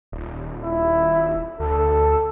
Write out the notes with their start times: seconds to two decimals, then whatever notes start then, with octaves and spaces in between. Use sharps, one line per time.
0.12 D#1
0.64 E4
1.60 D2 A4